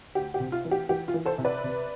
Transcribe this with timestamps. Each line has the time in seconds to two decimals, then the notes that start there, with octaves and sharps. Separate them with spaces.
0.15 D2 G4
0.34 G4
0.40 C3
0.52 F4
0.65 E3
0.71 G4
0.89 E3 G4
1.08 F4
1.14 E3
1.26 A4 C5
1.38 C3
1.44 B4 D5
1.63 C3